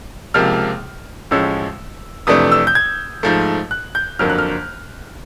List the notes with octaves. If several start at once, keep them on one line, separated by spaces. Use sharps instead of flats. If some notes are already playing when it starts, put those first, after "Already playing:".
C#2 C3 F3 A#3 F6
A1 A2 F3 G#3 C#4 E6
F2 C3 E3 A3 D4 D#6
E6
G6
G#6
G#2 F3 A3
F#6
G6
G1 F2 D3 F#3 A#3 F6
F#6
F6